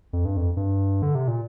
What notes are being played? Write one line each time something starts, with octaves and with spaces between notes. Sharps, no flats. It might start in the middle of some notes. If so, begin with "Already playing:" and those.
F2
G2
F2
G2
D3
C3
A#2